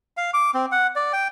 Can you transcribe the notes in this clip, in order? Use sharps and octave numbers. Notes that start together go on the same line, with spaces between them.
F5
D6
C4
F#5
D5
G5